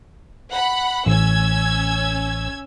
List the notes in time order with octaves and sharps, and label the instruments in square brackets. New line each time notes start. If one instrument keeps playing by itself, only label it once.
[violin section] F#5 B5
[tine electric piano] A1 [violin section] C#4 E6 G#6